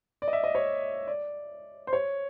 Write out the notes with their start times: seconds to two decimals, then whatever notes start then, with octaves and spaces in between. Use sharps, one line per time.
0.22 D5
0.28 D#5
0.33 E5
0.44 D#5
0.55 C#5
1.07 D5
1.87 C5
1.93 C#5